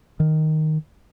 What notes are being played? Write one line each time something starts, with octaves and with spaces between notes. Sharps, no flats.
D#3